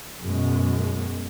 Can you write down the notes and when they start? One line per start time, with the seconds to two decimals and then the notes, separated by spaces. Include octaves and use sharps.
0.23 F#2 B2 G#3